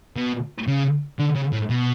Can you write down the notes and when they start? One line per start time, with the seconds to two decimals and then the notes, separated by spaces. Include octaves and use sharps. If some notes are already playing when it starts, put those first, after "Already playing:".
0.17 B2
0.67 C#3
1.19 D3
1.35 C#3
1.53 A2
1.70 B2